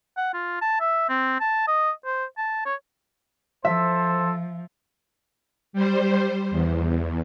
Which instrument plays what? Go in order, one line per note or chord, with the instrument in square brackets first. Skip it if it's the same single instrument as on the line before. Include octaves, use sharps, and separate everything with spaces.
[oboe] F#5
F4
A5
E5
C4
A5
D#5
C5
A5
C#5
[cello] F3 [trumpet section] A4 C5 [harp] E5
[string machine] G3 C5
E2